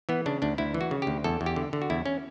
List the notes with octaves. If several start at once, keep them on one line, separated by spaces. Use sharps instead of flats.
E3 B3
C#3 D4
D2 D4
D2 E4
E3
F#4
C#3
D2 G4
E2 A4
E2
G4
D3
D3
F#4
E2 E4
C#4